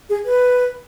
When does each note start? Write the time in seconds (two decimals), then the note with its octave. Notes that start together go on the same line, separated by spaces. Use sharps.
0.10 G#4
0.25 B4